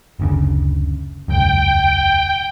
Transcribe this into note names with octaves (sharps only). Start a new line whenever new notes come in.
F#1 D2 C#3
E1 C#2 F#2 G5